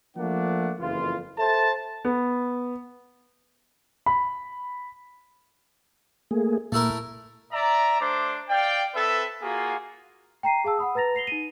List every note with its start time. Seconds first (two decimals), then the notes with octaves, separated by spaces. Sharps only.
0.17 F3 A3 A#3 D4 F#5
0.79 F#1 F2 E3 F4
1.39 A4 C5 E5 A5
2.05 B3
4.06 B5
6.31 A3 A#3 G#4
6.72 A#2 A3 E4 A#4
7.52 D5 E5 A#5
8.00 A3 D4 C5 D6
8.49 D5 F5 G5
8.95 C4 A4 B4 E5
9.42 A#3 F4 F#4 G#4
10.43 G5 A#5 C7 D#7
10.64 G#4 F5 A5 E6
10.78 F#5 B5 D#6
10.95 B4 A#5 A6 A#6 F7
11.15 A#6 C7 F7 G7
11.27 D#4 D#7